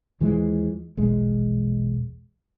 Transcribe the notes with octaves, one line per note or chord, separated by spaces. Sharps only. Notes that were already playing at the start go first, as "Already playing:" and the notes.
D#2 E3 F3 G#3
E1 A#1 G#3